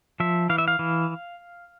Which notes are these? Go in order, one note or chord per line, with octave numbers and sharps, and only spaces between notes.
F3 E5
E3 F5
E5
F5
E3